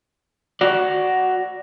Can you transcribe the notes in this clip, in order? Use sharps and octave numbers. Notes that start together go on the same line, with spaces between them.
F#4 D5